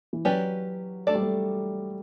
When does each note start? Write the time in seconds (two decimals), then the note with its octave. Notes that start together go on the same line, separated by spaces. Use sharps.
0.13 E3
0.25 F#3 C#4 G4 B4 D5
1.07 A3 D4 A4 D5
1.15 G3
1.23 A3